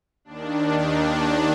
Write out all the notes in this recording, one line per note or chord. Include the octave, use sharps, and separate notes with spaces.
D#2 D#3 D4
D4